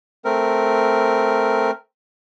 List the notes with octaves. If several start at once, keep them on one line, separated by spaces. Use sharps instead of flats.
A3 C4 A#4